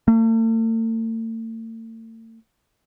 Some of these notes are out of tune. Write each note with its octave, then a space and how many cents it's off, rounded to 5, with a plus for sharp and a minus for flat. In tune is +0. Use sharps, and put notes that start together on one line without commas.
A3 +45